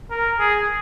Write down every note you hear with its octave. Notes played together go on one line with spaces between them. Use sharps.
A#4
G#4